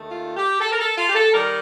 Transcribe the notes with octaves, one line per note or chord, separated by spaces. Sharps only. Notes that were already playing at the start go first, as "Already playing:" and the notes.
Already playing: D#2 D#3 A3
F4
G4
A4
A#4
A4
F4
G4
A4
D#3 G3 A#4